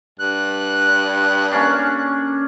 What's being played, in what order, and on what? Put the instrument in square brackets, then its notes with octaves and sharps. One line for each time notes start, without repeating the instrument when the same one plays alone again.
[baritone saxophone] G2 [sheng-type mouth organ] F#6
[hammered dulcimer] A#3 C#4 D4